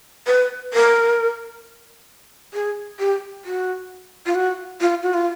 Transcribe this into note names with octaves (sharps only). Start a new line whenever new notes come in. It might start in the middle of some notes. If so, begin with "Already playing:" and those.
B4
A#4
G#4
G4
F#4
F4
F#4
F4
F#4
F4